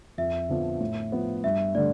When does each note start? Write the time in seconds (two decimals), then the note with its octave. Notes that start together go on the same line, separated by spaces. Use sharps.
0.18 F2 E5
0.49 D3 F3 B3 D4
0.81 A2
1.12 F3 B3
1.44 G2 E5
1.75 D3 A3 D5